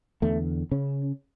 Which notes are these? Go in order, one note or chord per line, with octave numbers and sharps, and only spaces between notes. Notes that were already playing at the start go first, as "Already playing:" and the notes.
E2 D3 A3
C#3 C#4